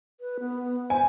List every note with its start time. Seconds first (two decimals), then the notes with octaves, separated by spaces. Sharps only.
0.20 B4
0.40 B3
0.90 C5 G#5